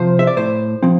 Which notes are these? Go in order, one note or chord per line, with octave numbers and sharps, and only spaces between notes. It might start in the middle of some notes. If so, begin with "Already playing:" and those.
Already playing: C3 F3 C5
E5
D5
A2 C5
F3 C4